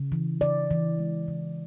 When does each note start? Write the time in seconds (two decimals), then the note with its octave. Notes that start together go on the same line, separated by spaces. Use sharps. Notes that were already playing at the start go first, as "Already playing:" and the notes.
Already playing: C#3
0.12 E3
0.41 C#3 D5
0.71 E3
0.99 G#3
1.28 C#3